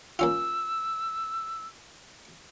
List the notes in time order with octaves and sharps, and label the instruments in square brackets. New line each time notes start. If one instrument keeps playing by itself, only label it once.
[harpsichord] A#3 C#4 F4 [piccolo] E6